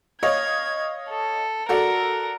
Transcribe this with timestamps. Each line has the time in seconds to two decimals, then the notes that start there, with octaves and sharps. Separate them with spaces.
0.23 C#5 D#5 F5 G#6
1.10 A4
1.69 F#4 A4 A#4 D5